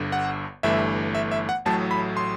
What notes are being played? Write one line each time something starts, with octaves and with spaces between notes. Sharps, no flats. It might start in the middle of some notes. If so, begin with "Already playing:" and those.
Already playing: G1 G2 D3
F#5
G1 G2 E3 A3 E5
E5
E5
F#5
A1 A2 F#3 A3 A5
B5
C6